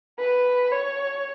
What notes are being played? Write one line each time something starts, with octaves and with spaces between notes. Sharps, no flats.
B4
C#5